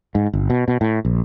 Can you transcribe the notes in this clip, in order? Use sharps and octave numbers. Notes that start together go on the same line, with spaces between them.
G#2
G1
B2
B2
A2
A#1